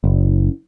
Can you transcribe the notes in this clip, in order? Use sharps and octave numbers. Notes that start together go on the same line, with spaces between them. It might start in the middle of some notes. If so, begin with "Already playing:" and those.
F#1